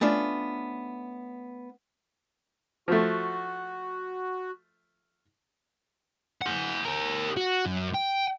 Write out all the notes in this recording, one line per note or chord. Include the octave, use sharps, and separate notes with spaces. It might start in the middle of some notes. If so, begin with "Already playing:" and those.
A3 B3 C#4 D4 F4
F3 A3 F#4
G#4 F#5
G4 A#4
F#4
F#2
G5